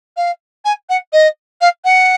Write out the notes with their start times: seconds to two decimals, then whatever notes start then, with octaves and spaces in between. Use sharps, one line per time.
0.16 F5
0.65 G#5
0.89 F#5
1.12 D#5
1.61 F5
1.84 F#5